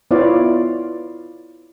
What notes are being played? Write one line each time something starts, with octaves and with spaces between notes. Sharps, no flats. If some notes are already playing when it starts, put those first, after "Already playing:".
B3 E4 F4 C#5 D5 F5